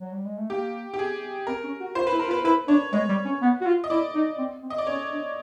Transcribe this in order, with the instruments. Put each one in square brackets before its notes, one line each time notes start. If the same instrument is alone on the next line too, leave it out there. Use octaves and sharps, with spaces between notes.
[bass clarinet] F#3
G3
G#3
A3
[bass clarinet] A#3 [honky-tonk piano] G4
[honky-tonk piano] G4
G#4
[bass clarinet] C4 [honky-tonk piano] A#4
[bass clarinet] C#4
F#4
[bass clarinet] F4 [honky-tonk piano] C5
[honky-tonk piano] B4
[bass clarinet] E4
[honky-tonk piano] A#4
[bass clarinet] F4
[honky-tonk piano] B4
[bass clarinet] E4 [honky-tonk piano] B4
[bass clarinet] D4 [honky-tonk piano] C#5
[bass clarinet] G#3 [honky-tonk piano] C#5
[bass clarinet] G3
C#4
B3
F#4
F4
[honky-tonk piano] D#5
[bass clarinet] E4 [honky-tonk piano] D5
[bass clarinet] D#4
C4
C4
[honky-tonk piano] D#5
D5
[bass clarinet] C#4 [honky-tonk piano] C#5
[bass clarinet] D4